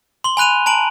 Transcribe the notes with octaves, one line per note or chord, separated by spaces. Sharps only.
C6 G7
G#5 B5 F#6 D#7 F7
A5 A#5 D7 F#7